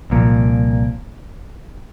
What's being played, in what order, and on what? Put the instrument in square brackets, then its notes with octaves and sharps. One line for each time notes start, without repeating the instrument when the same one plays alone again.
[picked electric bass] C2 A#2 F3 A#3